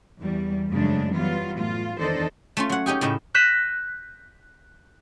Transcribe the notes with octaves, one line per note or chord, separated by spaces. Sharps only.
E2 G3
F#2 C#3 F3 G#3 A3 D4
E3 F#3 G3 B3 F4
A2 F4
E2 D#3 D4 A4 C5 D#5
A3 C#4 F4
F#3 F#5
C#4 D#4 G4 G#4
A2 C#3 D#4 E4
F#6 G6 A#6 B6 D#7 E7